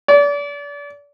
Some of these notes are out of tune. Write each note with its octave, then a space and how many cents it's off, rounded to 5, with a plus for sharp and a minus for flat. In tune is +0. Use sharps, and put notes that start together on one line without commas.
D5 -35